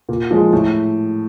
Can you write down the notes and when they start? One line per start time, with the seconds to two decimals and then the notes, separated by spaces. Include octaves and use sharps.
0.09 A#2
0.31 F3 G#3
0.53 A2